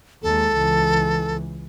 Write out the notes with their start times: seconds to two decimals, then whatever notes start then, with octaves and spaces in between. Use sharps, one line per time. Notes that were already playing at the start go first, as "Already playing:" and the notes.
0.23 D#2 G#3 A4
0.55 C#2 E3